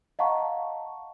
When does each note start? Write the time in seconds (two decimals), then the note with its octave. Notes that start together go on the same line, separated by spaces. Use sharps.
0.19 D#5 F5 F#5 A5 A#5 C#6